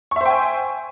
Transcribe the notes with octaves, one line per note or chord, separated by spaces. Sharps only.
C5 E5 G5 G#5 C#6